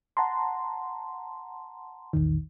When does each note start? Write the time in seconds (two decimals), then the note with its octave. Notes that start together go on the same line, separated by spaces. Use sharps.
0.17 F#5 A5 A#5 C6
2.13 A#1 E2 D#3